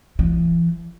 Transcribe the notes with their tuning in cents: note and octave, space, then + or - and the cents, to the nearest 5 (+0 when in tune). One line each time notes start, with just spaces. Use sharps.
E3 +40